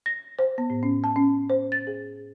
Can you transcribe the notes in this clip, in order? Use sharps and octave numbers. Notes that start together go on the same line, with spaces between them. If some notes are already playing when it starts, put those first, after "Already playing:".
A#6
C5
B3
A2
C#4
A5
C#4
C5
A6
G#4